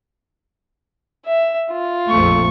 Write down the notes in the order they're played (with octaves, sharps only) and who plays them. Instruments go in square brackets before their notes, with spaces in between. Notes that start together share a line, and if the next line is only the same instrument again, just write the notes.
[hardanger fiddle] E5
F4
[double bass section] A#1 F2 A3 [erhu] C#6